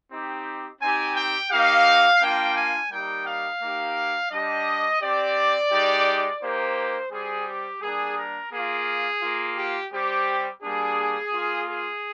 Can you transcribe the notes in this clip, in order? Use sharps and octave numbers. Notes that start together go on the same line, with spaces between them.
C4 D#4 G4
C4 D#4 G4 G#5
G5
A#3 D#4 G4 F5
A#3 D4 F4 G5
G#5
G3 A#3 D#4 G4 G5
F5
A#3 D#4 G4
G3 D4 G4 D#5
C4 G4 D5
G#3 D#4 G4
A#3 D#4 G4 C5
G3 C4 G4 G#4
G4
G3 A#3 D4 G#4
A#4
A#3 F4 G#4
A#3 F4
G4
G3 C4 G4
G3 A#3 D4 G#4
A#3 F4
G#4